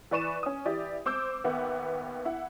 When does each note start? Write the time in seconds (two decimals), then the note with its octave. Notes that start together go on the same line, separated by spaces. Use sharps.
0.11 E3 B4 D5 C#6 D#7 E7
0.43 C#4 D#6
0.65 E3 E4 G4 D5
1.05 C4 C5 D6 E6 G6
1.44 D#2 B3 E5 F#5
2.25 E4 F#5